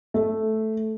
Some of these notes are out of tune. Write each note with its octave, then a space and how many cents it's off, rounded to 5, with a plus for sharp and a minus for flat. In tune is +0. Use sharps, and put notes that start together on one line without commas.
A3 -5